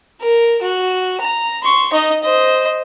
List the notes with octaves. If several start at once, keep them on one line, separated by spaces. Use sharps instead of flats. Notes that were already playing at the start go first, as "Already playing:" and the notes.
A#4
F#4
A#5
C6 C#6
D#4 D#5
C5 D#5